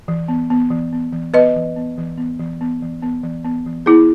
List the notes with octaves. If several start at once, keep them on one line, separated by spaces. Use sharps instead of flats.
E3
B3
B3
E3
B3
E3
B3 B4 D#5
E3
B3
E3
B3
E3
B3
E3
B3
E3
B3
E3
B3 E4 G#4